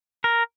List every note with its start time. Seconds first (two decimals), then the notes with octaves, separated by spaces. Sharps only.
0.24 A#4